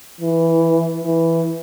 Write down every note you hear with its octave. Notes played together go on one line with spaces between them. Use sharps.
E3
E3